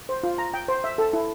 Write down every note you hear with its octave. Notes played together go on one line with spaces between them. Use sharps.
C5
F4
A#5
G5
C5
E5
A4
E4